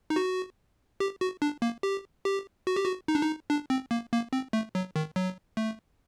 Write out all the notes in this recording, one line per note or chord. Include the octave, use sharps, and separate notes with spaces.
D#4
F#4
G4
F#4
D4
A#3
G4
G4
F#4
G4
F#4
D#4
D4
D#4
D4
C4
A#3
A#3
C4
A3
F#3
D#3
F#3
A3